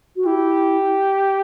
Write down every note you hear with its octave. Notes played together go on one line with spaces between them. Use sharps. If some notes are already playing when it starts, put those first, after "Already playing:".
F#4
E4 G4